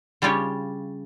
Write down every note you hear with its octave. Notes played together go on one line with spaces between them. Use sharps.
C#3 G3 D4 F4 G4 C#5